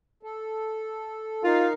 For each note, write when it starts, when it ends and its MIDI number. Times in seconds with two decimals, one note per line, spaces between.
0.23 1.43 69
1.44 1.73 63
1.44 1.68 65
1.44 1.73 70
1.44 1.73 77